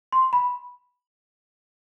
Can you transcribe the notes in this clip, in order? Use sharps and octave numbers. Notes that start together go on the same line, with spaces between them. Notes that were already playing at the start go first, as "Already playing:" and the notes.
C6
B5